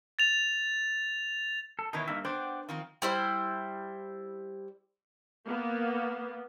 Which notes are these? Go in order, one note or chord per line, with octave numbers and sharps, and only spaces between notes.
A6 F7
A4
B2 D#3 E3 D#4 E4 C#5
G2 A#3 D#4 E5
B3 D4 C5 F#5 G5 D6
D#3 F3 C4
G3 E4 C5
A#3 B3